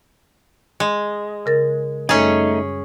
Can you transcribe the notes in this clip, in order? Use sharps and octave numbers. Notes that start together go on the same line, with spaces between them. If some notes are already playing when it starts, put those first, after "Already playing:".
G#3
C#3 A#4 A6
F#2 G3 A3 C#4 D#4 G#4